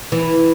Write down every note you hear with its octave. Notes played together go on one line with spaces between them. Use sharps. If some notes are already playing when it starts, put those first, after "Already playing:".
E3